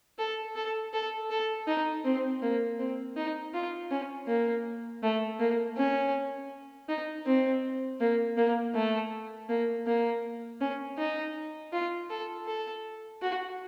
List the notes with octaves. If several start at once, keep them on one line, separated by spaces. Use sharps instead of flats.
A4
A4
A4
A4
D#4
C4
A#3
C4
D#4
F4
C#4
A#3
A3
A#3
C#4
D#4
C4
A#3
A#3
A3
A#3
A#3
C#4
D#4
F4
A4
A4
F#4